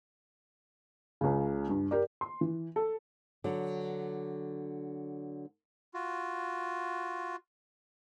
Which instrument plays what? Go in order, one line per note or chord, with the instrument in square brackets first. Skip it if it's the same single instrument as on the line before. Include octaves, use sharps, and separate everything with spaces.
[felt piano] C#2 C#3
G2
G4 A#4 D5
[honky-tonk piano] C6
E3
A4
[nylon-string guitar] D3 F#3
[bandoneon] F4 F#4